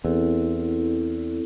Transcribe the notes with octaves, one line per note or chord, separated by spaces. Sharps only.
E2 C4 E4 A4